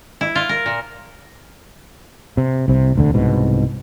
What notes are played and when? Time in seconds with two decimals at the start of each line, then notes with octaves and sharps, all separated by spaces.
0.21 E4
0.35 F4
0.49 A#4
0.66 A#2
2.37 C3
2.68 C2 C3
2.95 E1 D2 D3
3.14 C2 G#2 B2